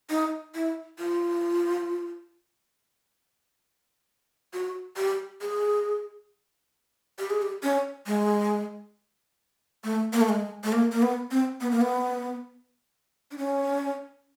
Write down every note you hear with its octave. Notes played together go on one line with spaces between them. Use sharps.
D#4
E4
F4
F#4
G4
G#4
G4
G#4
G4
C#4
G#3
A3
A#3
A3
G#3
A3
A#3
A#3
B3
C4
B3
A#3
B3
D4
C#4